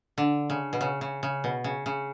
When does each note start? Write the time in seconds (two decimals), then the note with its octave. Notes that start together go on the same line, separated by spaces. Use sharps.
0.18 D3
0.50 C#3
0.73 B2
0.81 C#3
1.01 C#3
1.23 C#3
1.44 B2
1.64 C#3
1.86 C#3